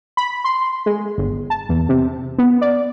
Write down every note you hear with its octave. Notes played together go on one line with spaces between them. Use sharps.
B5
C6
G#3
G1
A5
E2
C3
B3
D5